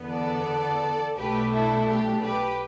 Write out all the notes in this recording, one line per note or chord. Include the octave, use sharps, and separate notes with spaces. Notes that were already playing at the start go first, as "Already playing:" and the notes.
Already playing: E2 D3 B3
A4 D5
B1 B2 A3 D4 G4 B4
E4 A4
G4
G4 B4